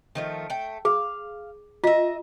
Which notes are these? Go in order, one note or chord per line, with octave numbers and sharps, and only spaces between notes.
D#3 F3 A3
A3 G5
G#4 F5
F4 D#5 E5